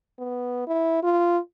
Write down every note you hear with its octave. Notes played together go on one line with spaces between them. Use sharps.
B3
E4
F4